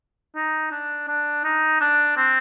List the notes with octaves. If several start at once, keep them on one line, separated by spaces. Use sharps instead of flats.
D#4
D4
D4
D#4
D4
C4